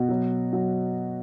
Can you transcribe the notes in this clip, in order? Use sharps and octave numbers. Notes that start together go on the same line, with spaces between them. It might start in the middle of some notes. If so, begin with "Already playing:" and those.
Already playing: B2 F#4
F#3
F#3